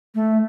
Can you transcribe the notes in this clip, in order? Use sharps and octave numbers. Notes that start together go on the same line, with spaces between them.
A3